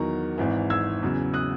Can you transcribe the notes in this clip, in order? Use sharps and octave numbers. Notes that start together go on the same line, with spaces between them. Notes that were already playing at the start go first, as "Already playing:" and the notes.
Already playing: E2 D#3 F#3 A#5 C#6
G#1 G#2 E3
E6 G#6
E2 C#3 F#3
D#6 F#6